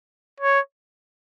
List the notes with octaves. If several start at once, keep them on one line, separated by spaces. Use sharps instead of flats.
C#5